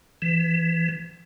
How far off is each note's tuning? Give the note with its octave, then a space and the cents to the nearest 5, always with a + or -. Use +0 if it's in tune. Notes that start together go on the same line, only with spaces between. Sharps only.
E3 +25